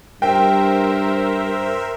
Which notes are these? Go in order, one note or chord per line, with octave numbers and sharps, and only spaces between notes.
G2 A#4 C5 E5 G5